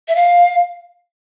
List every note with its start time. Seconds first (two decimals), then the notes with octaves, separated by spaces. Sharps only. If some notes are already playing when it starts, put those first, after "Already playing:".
0.08 E5
0.16 F5